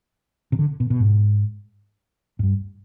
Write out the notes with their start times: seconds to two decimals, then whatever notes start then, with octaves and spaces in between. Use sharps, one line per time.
0.52 C3
0.59 D3
0.80 B2
0.90 B2
1.00 G#2
2.39 G#2
2.43 G2